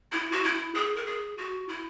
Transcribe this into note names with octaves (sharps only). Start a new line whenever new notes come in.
E4
F#4
E4
G#4
A#4
G#4
F#4
E4